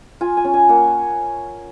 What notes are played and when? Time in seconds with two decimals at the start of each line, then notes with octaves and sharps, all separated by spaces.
0.21 F4 G#5
0.37 G#5
0.44 C#4
0.54 G#5
0.69 A#3 F#5